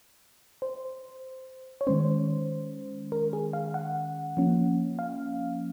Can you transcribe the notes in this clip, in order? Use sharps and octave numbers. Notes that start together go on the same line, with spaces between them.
C5
C#5
D#3 G#3 C#4 C5
A#4
G#4
F5
F#5
F3 A#3 C#4
F5